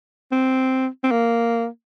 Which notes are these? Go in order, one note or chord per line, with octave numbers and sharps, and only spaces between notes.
C4
C4
A#3